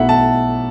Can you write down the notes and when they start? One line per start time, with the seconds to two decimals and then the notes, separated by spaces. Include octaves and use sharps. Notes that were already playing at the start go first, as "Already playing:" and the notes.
Already playing: B1 B2 A3 E4 E5 F#5
0.09 A5